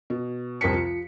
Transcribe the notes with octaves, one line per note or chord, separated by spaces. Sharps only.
B2
C2 F2 A#4 B6 C#7
F3